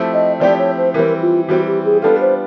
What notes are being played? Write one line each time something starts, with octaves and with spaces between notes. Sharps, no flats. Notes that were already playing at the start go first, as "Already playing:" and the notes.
Already playing: F3 A3 C4 E4 G4
D#5
F3 A3 C4 E4 G4 D5
C#5
C5
E3 G3 C4 A#4
F4
E3 G3 C4 F#4
G4
G#4
G3 B3 D4 F4 A4
C5